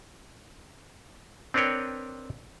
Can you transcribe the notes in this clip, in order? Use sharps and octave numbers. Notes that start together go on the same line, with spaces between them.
C4 D4 A#4 B4 C#5 G5